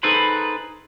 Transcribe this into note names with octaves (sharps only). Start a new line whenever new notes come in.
D#4 G#4 A4 B4 C5 B5